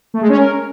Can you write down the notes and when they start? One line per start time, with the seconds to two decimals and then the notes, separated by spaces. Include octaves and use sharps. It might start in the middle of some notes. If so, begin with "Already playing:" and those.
0.14 A3
0.22 G#3
0.29 C#4
0.37 A#4